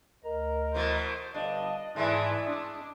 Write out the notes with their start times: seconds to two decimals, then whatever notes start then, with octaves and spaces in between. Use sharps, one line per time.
0.25 D2 A#4 D#5 A#5
0.74 B2 E3 A3 C5
1.35 G1 G2 D4 D#5 F5 A5
1.96 G#2 E3 G#3 A3 E4 D5 G#5 A5
2.45 D4 D#6